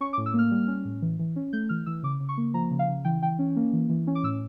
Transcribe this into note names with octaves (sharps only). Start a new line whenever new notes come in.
C#4 C#6
D6
A2
E6
A#3 F6
G3
C#4
A2
E3
E3
C#4
A3 G6
E3 F6
E3 E6
C#3 D6
C#3
C#6
A#3
F3 A#5
C#3
F5
C#3
E3 G5
E3 G5
C#4
A#3
E3
E3
C#4
D6
A2 E6